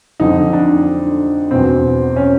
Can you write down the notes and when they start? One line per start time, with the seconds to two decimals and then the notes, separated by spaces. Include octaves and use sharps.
0.20 F2 D3 D#4
0.53 D4
1.51 E2 B2 C4
2.16 C#4